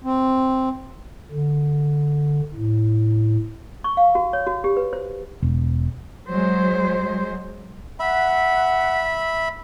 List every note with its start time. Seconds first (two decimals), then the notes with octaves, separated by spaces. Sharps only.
0.04 C4
1.32 D3
2.55 A2
3.84 C#6
3.97 F5
4.15 F#4
4.33 C#5
4.47 F#4
4.64 G4
4.77 B4
4.93 C5
5.42 E1
6.29 F#3 G#3 C5
8.00 E5 F#5 B5